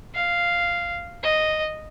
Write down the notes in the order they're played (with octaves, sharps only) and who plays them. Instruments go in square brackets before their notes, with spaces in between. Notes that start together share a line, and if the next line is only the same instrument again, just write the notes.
[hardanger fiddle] F5
D#5